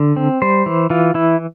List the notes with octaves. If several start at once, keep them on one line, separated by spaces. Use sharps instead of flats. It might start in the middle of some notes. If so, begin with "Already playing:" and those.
Already playing: D3
C4
G3 C5
E3
E3 F4
E3 E4